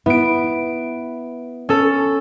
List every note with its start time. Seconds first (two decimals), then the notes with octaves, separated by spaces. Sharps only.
0.06 B3 E4 D7
1.69 C#4 A4